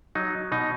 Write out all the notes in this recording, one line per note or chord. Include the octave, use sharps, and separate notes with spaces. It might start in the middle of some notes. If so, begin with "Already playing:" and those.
F#3 D#4
B2 D#4